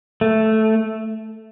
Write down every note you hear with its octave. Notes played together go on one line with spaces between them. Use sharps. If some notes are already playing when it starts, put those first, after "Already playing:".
A3